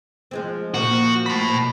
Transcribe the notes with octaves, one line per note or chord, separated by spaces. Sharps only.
F3 G#3 C4
A#2 F3 A#3 F#4
A5 B5
B2